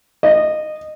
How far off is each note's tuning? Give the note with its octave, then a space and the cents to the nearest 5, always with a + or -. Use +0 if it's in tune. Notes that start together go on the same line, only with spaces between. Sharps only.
D#5 -20